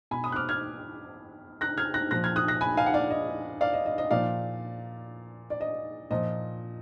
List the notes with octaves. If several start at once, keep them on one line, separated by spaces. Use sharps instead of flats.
B2 G#5 B5
B5 D#6
F#6
D6 F6
F6 G#6
F#6 A#6
F6 G#6
F#6 A#6
A#2 F3 F#6 A#6
F6 G#6
D#6 F#6
F#6 A#6
G#5 B5
F5 G#5
F#5
D5 F5
D#5
D5 F5
D#5
D#5
D#5
A#2 F3 D5 F5
D5
D#5
A#2 F3 D#5